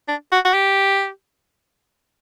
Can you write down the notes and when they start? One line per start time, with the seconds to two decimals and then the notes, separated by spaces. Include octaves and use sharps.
0.08 D4
0.32 F#4
0.45 F#4
0.54 G4